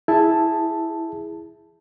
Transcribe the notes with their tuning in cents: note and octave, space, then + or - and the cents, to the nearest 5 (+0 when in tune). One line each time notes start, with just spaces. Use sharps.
E4 +0 G#4 +0 A5 +0